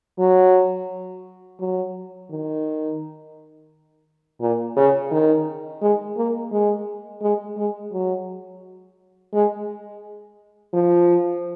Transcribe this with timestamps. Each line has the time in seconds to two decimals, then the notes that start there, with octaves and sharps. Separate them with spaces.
0.19 F#3
1.60 F#3
2.30 D#3
4.41 A#2
4.77 C#3
5.11 D#3
5.82 G#3
6.17 A#3
6.52 G#3
7.22 G#3
7.57 G#3
7.93 F#3
9.34 G#3
10.73 F3